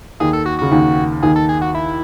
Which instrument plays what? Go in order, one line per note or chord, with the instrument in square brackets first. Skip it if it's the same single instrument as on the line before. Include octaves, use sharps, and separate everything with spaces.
[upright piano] D#2 D#3 [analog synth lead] G#4
[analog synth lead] A4
F#4
[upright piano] C#3 [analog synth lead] F#4
[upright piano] D#2 D#3
[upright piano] D#2 D#3 [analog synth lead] G#4
[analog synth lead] A4
G#4
F#4
E4